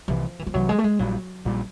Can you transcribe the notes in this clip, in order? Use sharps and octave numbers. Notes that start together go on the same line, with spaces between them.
C2 C3 E3 F3
E3
F3
C2 C3 E3 F#3
G#3
A3
G#3
A#1 A#2 F#3 G3
A#1 A#2 G3